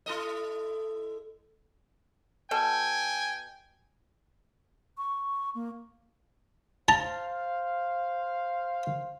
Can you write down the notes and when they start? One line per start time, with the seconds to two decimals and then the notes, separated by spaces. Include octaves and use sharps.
0.06 E4 A4 D#5
2.51 B2 A4 G5 G#5
4.97 C#6
5.55 A#3
6.88 C5 F5 A5 A#5